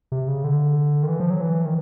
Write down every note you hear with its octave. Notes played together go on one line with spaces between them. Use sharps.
C3
C#3
D3
D#3
E3
F3
F#3
E3
D#3